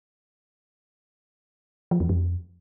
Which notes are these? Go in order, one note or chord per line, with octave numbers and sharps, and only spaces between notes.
F3
E2
F2